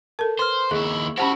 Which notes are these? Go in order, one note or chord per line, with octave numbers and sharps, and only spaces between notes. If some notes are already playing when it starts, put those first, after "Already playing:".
A4 A#4 A5
B4 C5 C6 F6
D#2 E4 G#4 C#6
C#4 E4 F#4 G4 C5 F#5 A5 B5